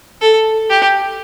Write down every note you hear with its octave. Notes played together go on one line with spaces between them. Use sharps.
A4
G4